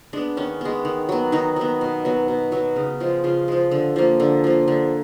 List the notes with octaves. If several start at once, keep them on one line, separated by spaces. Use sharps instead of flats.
G#3 B3 D4
D#3 C#4
G#3 B3
D#3
F#3 B3
D#3 D#4
F#3 B3
B2
F#3 B3
B2
F#3 B3
C#3
F3 G#3
C#3 F4
F3 G#3
D3
F3 A#3
D3
F3 A#3
D3